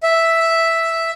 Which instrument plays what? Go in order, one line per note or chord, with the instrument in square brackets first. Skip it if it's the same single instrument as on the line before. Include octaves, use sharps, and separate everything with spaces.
[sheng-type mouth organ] E5